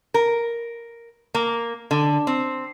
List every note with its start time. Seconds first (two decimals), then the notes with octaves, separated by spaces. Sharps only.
0.14 A#4
1.34 A#3
1.91 D3
2.27 C4